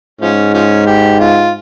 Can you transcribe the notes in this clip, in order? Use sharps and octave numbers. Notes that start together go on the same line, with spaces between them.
G#2 F3 C#4
F3 C#4
G4
F4